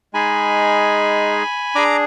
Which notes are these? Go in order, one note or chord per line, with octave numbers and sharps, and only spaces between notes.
G#3 D#4 G#4 G#5 B5
D4 G#4 A#5 D6